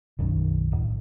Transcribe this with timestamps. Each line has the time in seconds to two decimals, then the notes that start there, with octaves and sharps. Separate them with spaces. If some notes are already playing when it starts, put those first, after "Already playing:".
0.19 B1 F#2 D#3
0.72 D1